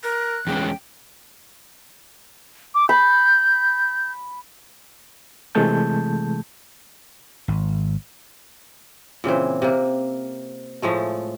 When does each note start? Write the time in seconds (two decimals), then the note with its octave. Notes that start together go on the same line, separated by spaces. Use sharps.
0.03 A#4 F#6
0.47 E2 G#3 C#4 G5
2.74 D6
2.89 B5 G6
5.55 C3 E3 G#3 A3 A5 G6
7.48 G#1
9.24 A#2 C#3 E3 C4
9.62 C3 A#3
10.82 A2 F3 G#3 A3